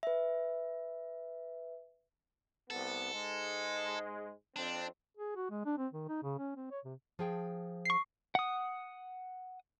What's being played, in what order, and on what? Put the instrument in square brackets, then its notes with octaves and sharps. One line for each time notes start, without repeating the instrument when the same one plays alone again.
[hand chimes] B4 E5
[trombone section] C2 B3 [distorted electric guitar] A4
[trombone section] G#2 G#3
[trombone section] F2 C4 [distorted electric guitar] D4
[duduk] G#4
F#4
G#3
D4
C4
D#3
D#4
C#3
C#4
C4
C#5
C3
[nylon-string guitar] F3 G#4 G5
[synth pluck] C#6 C7
[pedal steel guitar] F#5 D#6